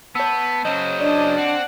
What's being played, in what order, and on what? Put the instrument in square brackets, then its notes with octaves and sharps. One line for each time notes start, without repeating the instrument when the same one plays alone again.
[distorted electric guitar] B3 [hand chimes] C#5 E6 [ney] A5
[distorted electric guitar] C#3 F#3 [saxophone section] C#4 C5 D#5
[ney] D4 [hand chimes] D5
[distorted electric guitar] C4 [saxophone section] F#5